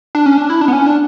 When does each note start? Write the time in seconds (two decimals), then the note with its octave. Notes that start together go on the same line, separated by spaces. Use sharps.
0.15 D4
0.26 C#4
0.38 D4
0.50 E4
0.61 D4
0.68 B3
0.73 C#4
0.86 D4